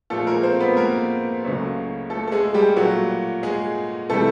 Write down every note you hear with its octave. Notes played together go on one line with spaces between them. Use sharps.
A#2 F3 G#3 A3 A4
A#3 A#4
C4 C5
B3 B4
A#3 A#4
C#2 C#3 F#3 A3
A3 A4
A4
G#3 G#4
G3 G4
A#2 F#3 A3 F#4
G#3 G#4
C3 E3 G3 A3 A4